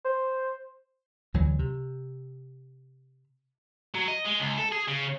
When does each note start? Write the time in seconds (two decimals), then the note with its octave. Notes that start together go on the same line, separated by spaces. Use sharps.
0.05 C5
1.34 D2 E3 F#3
1.59 C3
3.95 F#3
4.08 D#5
4.25 G#3
4.40 C#2
4.58 A4
4.72 G#4
4.88 C#3